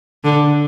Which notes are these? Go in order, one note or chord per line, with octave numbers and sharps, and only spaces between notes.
D3